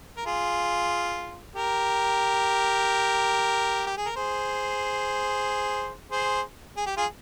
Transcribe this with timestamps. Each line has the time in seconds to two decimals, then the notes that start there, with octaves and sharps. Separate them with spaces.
0.17 A#4
0.25 F4 G#4
1.55 G4 A#4
3.86 G4
3.97 G#4
4.06 A#4
4.16 G#4 C5
6.11 G#4 C5
6.77 G#4
6.86 G4
6.97 F4 G#4